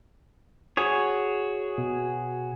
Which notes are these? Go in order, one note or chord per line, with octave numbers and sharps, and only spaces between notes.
F#4 G#4 C#5 D#6
B2